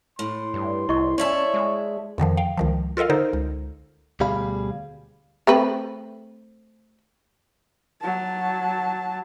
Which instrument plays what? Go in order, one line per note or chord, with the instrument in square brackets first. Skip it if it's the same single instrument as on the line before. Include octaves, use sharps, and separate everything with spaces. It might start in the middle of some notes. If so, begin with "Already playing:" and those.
[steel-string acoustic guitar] A2 [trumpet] C6
[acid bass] G2
[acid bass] C2 [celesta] E4 D#5 C#6
[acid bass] C#4 [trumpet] C#5 [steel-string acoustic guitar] D5 E5 A5
[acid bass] G#3
[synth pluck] F2 D3 D#3 F3
F5 G5
C#2 D#3 F3
F4 A4 A#4 D#5 F5
D3 D#4 A4 A#4 C5
C#2
[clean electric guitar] D2 B2 G3 G#4 F5 B5
[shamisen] A3 C4 B4
[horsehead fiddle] F#3 A5